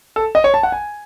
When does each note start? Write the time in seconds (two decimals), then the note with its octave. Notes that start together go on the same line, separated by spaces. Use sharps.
0.16 A4
0.35 D#5
0.44 C#5
0.54 A5
0.63 F#5
0.72 G#5